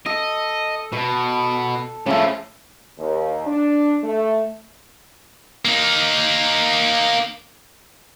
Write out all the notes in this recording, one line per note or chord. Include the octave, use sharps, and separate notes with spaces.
A4 D#5
B2 A4
A2 C#3 F3 A3
D#2
D4
A3
A#3 D#4